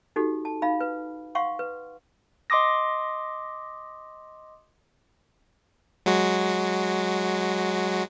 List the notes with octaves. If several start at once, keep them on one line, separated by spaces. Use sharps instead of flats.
D#4 F#4 G4 A4
A5
D#4 F5 B5
B4
F5 F#5 C6 C#6
B4
D#5 C6 D6 D#6 A#6
F#3 G#3 F#4